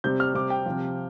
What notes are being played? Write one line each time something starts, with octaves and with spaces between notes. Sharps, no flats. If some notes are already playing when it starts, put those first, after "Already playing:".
C3 G3 G6
F6
C3 G3 D6
G5
C3 F3